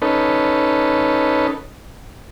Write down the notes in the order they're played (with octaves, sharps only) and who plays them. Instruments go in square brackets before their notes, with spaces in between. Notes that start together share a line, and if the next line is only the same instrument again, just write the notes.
[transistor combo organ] C#4 D#4 A4 B4